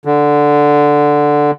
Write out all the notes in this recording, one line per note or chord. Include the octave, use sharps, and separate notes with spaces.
D3